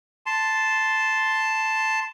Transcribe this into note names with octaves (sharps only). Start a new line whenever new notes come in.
A5 C6